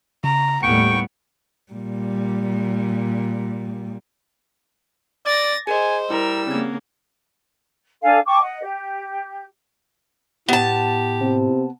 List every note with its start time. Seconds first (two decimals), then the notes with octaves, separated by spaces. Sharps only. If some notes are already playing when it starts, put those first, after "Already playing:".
0.24 C#3 A#5
0.63 D#2 A2 G3 B3 G5 C#6 C#7
1.72 A#2 G3
5.26 D5 D6 A6 A#6
5.67 G#4 A#4 C5 D#5 G#5
6.10 G3 E4 A#4 E6
6.47 C#3 A#3 C4 G#6
8.02 D4 A4 F5 G#5
8.26 G5 A5 C#6 D6
8.40 D#5 F#5
8.63 G4
10.49 A2 B3 G4 A5
11.21 C3